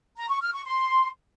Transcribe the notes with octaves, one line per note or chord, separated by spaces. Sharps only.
A#5
C#6
F6
C#6
C6